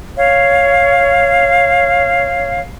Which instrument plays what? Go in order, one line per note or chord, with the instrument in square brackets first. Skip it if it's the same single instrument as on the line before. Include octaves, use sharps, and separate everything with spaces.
[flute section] C#5 F5